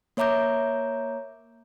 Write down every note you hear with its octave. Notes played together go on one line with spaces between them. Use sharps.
A#3 C#5 E5 A#5 D6 G6